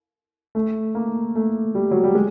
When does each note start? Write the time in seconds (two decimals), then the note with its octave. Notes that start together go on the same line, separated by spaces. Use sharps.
0.55 A3
0.95 A#3
1.35 A3
1.75 G3
1.91 F#3
2.04 G3
2.15 G#3